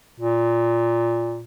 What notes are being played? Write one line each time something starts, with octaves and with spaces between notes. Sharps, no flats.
A#2